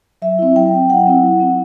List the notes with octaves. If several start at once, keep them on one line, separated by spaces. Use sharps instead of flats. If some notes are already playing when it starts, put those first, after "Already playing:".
F#3 E5
C4 E4
F#3 G5
C4 E4
F#3 F#5
C4 E4
F#3
C4 E4